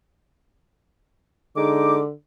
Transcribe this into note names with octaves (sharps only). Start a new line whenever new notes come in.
D3 G#3 D#4 D6